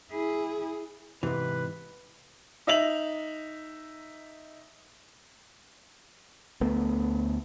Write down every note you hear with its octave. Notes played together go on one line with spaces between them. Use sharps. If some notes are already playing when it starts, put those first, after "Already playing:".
E4 G#4
G#2 C3 E3 B4
D#4 E5 F7 F#7
D2 A3 B3